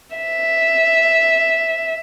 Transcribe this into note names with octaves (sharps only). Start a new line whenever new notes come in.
E5